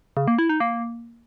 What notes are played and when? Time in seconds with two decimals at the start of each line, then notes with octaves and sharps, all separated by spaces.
0.17 C#3
0.28 A#3
0.38 E4
0.49 D#4
0.60 A#3